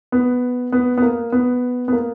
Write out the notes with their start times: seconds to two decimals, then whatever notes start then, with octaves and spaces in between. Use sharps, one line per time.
0.12 B3
0.72 B3
0.98 B3
1.02 A#3
1.32 B3
1.88 B3
1.93 A#3